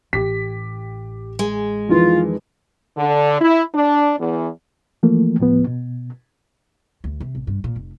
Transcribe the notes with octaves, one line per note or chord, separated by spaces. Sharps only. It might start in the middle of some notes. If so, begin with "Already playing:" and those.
A1 G4 B6
G#3
F2 D#3 E3 F4
D3
E4
D4
E2
E3 F3 A3 A#3
D2 A2 F3 B3
B2
D2
C3
A1
G2
A#2
F1